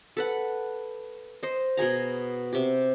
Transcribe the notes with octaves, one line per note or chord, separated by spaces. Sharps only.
A4 B4 F#5
C5 D#5
B2 G#4 G#5 A#5
C3 G4